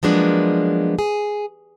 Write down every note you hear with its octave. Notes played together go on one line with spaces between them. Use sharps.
F3 F#3 G#3 A#3 B3 D4
G#4